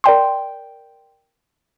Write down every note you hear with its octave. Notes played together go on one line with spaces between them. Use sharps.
A#4 D5 G5 C6